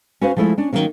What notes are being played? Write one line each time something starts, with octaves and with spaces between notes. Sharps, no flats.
C#4 F#4 B4 C5 F5
F3 G#3 A3 E4 F4
C#4 D4
D#3 F3 F#3 A#3 C#4